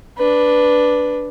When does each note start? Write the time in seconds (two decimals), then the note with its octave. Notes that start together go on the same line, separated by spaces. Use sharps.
0.17 D4 B4